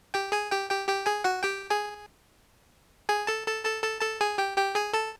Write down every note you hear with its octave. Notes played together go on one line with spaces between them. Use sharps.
G4 G5
G#4 G#5
G4 G5
G4 G5
G4 G5
G#4 G#5
F#4 F#5
G4 G5
G#4 G#5
G#4 G#5
A4 A5
A4 A5
A4 A5
A4 A5
A4 A5
G#4 G#5
G4 G5
G4 G5
G#4 G#5
A4 A5